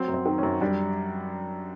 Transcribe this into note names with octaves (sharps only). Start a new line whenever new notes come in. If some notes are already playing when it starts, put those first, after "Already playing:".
Already playing: F#3 C4
F#2
C4
D#3
F#2 C#4
G3 D4